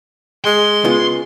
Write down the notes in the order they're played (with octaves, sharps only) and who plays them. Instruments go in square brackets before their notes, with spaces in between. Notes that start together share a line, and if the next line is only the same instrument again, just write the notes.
[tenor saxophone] G#3 [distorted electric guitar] C6
[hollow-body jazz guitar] C#3 B3 F4